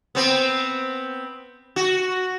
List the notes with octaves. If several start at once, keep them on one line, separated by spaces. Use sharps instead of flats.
B3 C4
F#4